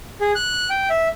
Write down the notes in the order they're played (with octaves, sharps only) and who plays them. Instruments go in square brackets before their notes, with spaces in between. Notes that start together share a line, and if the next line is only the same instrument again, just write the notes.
[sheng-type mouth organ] G#4
F#6
G5
E5